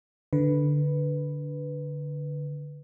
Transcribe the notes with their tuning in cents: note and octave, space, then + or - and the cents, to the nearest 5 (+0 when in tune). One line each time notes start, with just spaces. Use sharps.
D3 +0 B4 +0